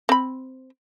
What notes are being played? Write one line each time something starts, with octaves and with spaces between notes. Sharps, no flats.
C4 B5